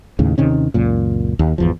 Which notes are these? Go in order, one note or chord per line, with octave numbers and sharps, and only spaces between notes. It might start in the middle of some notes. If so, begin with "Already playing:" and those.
D#2 A2 C#3
D#2 C3 D#3 C#4
C#2 F#2 A#2
D#2
G#1 E2 F3